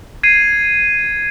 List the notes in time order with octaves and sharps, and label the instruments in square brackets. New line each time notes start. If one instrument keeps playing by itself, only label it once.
[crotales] G#6 C7 D#7